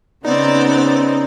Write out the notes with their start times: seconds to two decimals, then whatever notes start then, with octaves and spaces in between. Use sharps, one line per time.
0.24 C#3 B3 C4 D#4 D5